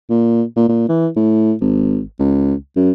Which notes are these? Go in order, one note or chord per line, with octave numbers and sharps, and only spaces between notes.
A#2
A#2
A#2
E3
A2
G#1
C#2
F#2